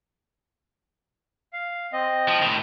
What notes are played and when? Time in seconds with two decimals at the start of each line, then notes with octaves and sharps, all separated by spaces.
1.53 F5
1.93 C4 D#5
2.28 F3
2.41 A2 D#3